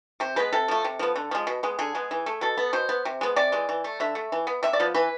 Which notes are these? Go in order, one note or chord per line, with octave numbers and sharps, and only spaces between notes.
C3 C5
G#3 B3 B4
C3 A4
F3 A3
C3
F3 B3
D3
F3 G#3
B2
G#3 B3
D3 G#4
G#3 B3
E3
A3
B2 A4
B3
B2 C5
B3
C3
G#3 B3
C3 D5
E3 G#3
E3
A3
D3 E5
A3
E3
B3
C3 E5
D5
F3 B3
E3 B4